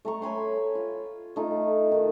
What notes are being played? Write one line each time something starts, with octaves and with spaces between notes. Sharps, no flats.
A3 A#5 C#6
C#5 G#5 B5 C6
F4
A3 D#4 F4
D#3 F#4